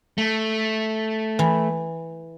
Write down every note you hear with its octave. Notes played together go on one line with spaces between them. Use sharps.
A3
E3